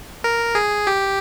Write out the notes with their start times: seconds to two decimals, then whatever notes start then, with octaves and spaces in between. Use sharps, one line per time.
0.24 A#4
0.55 G#4
0.87 G4